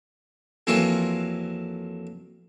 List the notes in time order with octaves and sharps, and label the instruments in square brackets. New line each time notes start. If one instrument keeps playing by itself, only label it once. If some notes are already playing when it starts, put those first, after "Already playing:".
[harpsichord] F2 E3 F#3 A#3 F4 C#6